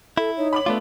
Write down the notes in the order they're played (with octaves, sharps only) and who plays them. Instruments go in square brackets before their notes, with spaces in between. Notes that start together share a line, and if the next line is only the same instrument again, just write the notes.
[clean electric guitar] E4 [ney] A4
[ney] D#4 [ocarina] C#5
[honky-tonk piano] B5 D6 F#7
[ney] A3 [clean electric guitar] B3 D4 F4